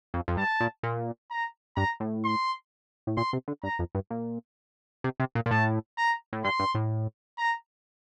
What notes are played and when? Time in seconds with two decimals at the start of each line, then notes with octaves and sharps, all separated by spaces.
0.14 F2
0.28 F2
0.37 G2 A5
0.60 A#2
0.83 A#2
1.31 A#5
1.76 G2 A#5
2.00 A2
2.24 C6
3.07 A2
3.17 A#2 C6
3.33 C3
3.48 D3
3.63 G2 A#5
3.79 F2
3.95 G2
4.10 A#2
5.04 C3
5.20 C3
5.35 A#2
5.46 A#2
5.51 A2 A5
5.98 A#5
6.33 A2
6.44 G2 C6
6.60 G2
6.75 A2
7.38 A#5